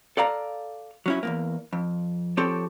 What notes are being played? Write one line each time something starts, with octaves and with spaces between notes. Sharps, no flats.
A4 D5 F5 A#5
F#3 C#4 E4
E2 G2 A#3
F2
F3 C4 G4 A4 C#5